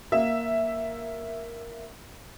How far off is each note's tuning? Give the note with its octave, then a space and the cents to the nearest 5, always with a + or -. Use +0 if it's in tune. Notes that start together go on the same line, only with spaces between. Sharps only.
A#3 +5 E5 +0